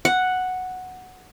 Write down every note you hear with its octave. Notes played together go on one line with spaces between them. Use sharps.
F#5